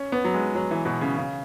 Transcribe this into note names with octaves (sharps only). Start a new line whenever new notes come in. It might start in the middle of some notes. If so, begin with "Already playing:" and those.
Already playing: C#4
B3
F#3
G#3
F#3
E3
B2
C#3
C#3